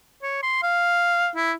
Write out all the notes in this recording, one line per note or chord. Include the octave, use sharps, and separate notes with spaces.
C#5
C6
F5
E4